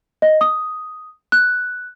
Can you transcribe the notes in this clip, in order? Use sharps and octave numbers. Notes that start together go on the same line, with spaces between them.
D#5
D#6
F#6